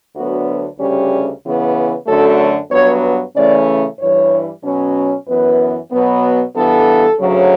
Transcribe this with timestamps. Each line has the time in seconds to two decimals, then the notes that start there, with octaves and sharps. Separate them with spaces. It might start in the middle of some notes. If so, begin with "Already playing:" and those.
0.15 D2 D3 F#3 B3 F#4
0.79 D2 C#3 G3 C#4 G4
1.43 C#3 E3 B3
2.07 F#2 D3 F#3 A3 A4
2.71 G2 F#3 B3 C#5
3.35 C#3 E3 A3 C#4 D5
4.00 G2 E3 G3 C#5
4.64 B2 F#3 C#4
5.27 F#2 E3 B3 B4
5.91 B2 F#3 B3
6.56 G2 E3 B3 A4
7.20 D2 C#3 F#3